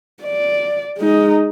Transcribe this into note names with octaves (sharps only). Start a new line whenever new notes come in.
D5
G#3 D#4